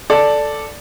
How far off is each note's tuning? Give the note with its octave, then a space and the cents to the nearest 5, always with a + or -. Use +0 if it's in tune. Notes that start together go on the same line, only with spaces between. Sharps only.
A4 +0 D5 +0